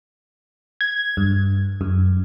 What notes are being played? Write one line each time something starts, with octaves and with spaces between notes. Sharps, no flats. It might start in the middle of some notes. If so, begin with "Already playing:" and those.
G#6
G2
F#2